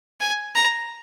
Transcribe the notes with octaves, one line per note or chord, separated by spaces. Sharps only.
G#5
A#5